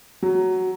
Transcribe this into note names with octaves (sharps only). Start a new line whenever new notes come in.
F#3